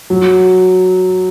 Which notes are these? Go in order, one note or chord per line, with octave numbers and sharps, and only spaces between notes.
F#3